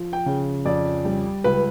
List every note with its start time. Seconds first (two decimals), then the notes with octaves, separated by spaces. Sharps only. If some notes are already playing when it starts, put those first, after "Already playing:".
Already playing: F3
0.13 G5
0.26 C#3
0.65 F2 D5
1.05 G3
1.44 C#2 B4